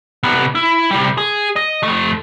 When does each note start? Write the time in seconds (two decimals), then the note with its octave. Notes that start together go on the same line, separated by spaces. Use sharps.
0.23 C3 B3
0.55 E4
0.91 C3 G3
1.18 G#4
1.56 D#5
1.83 F2 A3